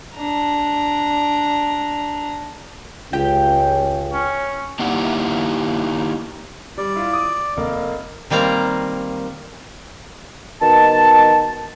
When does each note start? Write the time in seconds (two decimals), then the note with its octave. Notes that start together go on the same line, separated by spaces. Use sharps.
0.16 D4 A#5
3.13 C#2 G4 G5
4.13 C#4
4.79 A#3 D#4 E4 G4 F#5
6.78 G3 D5
6.96 E4 F4
7.13 D6 D#6
7.57 F1 A#3
8.30 D#3 G3 A#3 C4 A#5
10.62 B2 D#3 A5